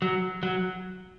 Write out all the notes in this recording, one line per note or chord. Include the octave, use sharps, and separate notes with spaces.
F#3
F#3